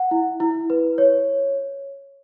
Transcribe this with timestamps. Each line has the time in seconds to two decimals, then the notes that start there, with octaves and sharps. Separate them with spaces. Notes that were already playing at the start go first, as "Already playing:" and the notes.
Already playing: F#5
0.11 E4
0.40 E4
0.70 B4
0.98 C#5